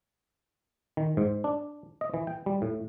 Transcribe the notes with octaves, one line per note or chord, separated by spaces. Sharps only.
D#3
G#2
D4
D#5
E3
G5
G3
A2